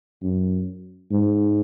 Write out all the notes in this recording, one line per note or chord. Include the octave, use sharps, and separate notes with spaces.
F#2
G#2